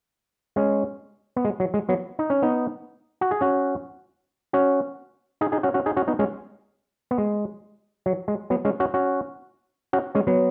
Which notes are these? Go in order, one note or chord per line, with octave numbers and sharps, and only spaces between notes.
G#3 C#4
B3
G#3
F#3
G#3
F#3 B3
D#4
C#4
B3 D#4
F#4
G#4
C#4 F#4
C#4 F#4
D#4 G#4
D#4 G#4
C#4 F#4
C#4 F#4
D#4 G#4
C#4 F#4
B3 D#4
G#3 C#4
B3
G#3
F#3
G#3
F#3 B3
G#3 C#4
C#4 F#4
C#4 F#4
C#4 F#4
G#3 C#4
F#3 B3